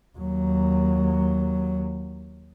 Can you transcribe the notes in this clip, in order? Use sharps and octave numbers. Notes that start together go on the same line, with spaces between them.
D#2 F#3